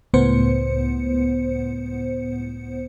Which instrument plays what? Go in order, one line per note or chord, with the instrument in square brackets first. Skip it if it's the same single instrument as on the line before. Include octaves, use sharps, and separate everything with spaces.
[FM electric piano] C#2 A2 B3 C5 C#7